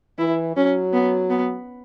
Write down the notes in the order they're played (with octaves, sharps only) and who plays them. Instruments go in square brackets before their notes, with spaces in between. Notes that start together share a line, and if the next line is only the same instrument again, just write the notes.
[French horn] E3 [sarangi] E4
[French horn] F#3 [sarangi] C#4
[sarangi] B3
B3